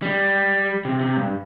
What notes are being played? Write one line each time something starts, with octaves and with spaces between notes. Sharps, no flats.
G3
C3
C3
G2